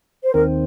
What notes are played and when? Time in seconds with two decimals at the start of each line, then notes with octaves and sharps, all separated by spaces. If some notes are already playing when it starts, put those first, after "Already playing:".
0.24 C5
0.34 D#2 D#3 C4 A#4